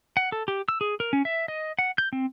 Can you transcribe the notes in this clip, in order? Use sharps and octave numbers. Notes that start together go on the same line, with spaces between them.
F#5
A4
G4
E6
G#4
A#4
C#4
E5
D#5
F#5
G6
C4